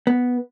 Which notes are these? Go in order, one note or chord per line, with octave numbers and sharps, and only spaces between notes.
B3